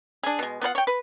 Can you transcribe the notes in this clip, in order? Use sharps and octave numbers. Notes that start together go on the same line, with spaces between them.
D4 G#4
B2 G#3
B3 F4 B4 F#5
C#5 G5
B4